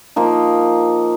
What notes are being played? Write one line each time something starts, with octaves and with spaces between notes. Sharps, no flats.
F3 A#3 D#4